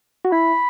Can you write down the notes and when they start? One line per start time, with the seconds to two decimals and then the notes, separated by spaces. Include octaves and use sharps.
0.25 F#4
0.32 E4 B5